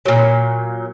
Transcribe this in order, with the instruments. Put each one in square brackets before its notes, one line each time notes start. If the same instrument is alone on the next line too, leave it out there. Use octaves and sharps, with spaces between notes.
[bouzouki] A#2 F#3